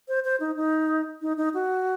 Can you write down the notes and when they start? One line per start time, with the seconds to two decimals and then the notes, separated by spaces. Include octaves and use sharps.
0.08 C5
0.25 C5
0.40 D#4
0.56 D#4
1.22 D#4
1.38 D#4
1.54 F#4